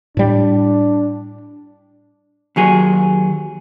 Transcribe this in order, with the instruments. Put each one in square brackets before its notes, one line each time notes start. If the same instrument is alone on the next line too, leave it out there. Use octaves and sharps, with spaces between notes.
[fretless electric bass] A2 G3 [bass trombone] D4
[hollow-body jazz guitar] D#2 F#3 G#4